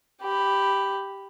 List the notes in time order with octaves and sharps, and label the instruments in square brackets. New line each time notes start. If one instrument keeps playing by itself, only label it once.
[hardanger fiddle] G4 B5